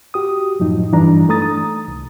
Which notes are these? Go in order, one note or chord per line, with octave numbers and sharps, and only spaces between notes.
F#4 G4 D#6
F#2 A2 F3 D#4
G2 E3 G3 D4 D#4 A#5
A3 A4 A#5 D#6 A6
D#6
C2